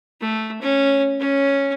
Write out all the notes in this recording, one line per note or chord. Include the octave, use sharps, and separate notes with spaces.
A3
C#4
C#4